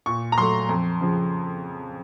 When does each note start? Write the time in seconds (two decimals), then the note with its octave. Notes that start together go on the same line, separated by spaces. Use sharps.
0.06 A#2 C#6
0.32 A#5
0.38 F#3 A3 C6
0.69 F2
1.01 C#3 F3